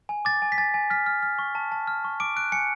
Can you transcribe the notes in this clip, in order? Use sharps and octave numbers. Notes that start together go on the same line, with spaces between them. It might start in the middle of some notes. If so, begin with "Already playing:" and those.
G#5
D6 A6
G#5
B6
G#5 A6
G#5
F6 B6
F6
F6
C#6
A5
A5
F6
C#6
D6 D7
F#6 D7
G#5 C#7